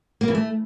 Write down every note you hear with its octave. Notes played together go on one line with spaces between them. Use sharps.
A#3
E3
A3